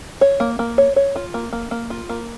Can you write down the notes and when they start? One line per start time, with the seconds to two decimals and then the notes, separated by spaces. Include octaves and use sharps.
0.21 C#5
0.40 A#3
0.59 A#3
0.78 C#5
0.96 C#5
1.16 F4
1.34 A#3
1.53 A#3
1.71 A#3
1.90 F4
2.09 A#3